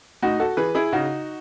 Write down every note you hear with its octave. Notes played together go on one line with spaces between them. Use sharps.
A2 D#4 F#4
F#4 A4
E3 G#4 B4
E4 G#4
C#3 D#4 F#4